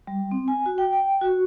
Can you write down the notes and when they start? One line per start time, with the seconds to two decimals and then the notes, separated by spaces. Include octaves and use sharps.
0.07 G3
0.31 C4
0.48 G#5
0.66 F#4
0.78 G5
0.93 G5
1.21 F#4